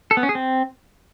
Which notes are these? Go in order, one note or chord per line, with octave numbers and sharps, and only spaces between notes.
A4
B3
C#4
G#4
C4